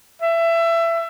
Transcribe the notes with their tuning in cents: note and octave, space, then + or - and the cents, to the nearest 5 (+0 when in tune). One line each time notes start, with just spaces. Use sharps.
E5 +25